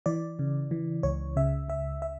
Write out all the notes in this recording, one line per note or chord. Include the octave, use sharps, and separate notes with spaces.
E3 D5
C#3
E3
C#2 C#5
C#3 E5
C#2 E5
E5